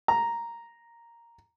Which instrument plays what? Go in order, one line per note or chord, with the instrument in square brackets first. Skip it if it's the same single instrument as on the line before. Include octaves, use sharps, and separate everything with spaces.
[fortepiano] A#5